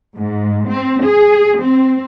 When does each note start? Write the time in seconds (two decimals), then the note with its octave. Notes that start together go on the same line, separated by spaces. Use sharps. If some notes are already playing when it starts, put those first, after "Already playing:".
0.16 G#2
0.69 C4
1.05 G#4
1.62 C4